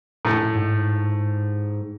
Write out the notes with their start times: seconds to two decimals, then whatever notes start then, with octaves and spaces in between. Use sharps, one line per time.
0.25 A2
0.55 G#2